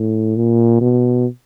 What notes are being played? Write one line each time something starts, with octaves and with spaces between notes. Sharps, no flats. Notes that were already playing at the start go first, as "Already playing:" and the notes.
Already playing: A2
A#2
B2